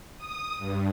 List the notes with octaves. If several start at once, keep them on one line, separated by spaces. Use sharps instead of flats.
D#6
G2